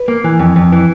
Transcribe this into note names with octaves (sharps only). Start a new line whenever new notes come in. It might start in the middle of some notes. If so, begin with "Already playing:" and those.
Already playing: B4
A#3
E3
F2
F2
E3